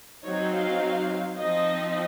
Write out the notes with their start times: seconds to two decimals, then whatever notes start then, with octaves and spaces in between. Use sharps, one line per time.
0.23 F#3 C4 D#4 C#5
0.52 F5
1.38 F3 C4 D#4 D#5